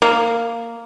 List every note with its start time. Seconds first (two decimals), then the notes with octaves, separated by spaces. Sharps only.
0.02 A#3